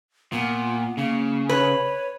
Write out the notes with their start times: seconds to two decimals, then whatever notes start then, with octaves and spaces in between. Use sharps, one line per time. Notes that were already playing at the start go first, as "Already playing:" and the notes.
0.32 A#2 B3
0.97 C#3 A#3
1.49 B4 C#5